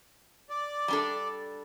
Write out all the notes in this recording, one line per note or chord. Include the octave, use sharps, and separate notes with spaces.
D5
G3 D4 A4